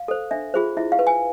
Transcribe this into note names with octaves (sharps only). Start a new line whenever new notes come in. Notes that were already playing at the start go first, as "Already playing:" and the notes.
Already playing: F5
A4 C5
D4 E5
F4 G#4 C5
E4 E5
F5
B4
G#5